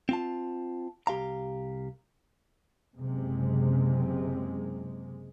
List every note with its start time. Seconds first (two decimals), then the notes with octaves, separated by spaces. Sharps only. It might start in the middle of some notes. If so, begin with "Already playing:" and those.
0.09 C4 F4 A5
1.07 C2 G4 F5 A#5
2.97 F#1 C3 G#3